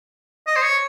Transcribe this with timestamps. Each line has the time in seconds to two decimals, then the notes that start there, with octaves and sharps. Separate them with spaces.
0.47 D#5
0.56 C5
0.62 C#5